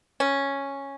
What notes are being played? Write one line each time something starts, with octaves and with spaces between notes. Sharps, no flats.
C#4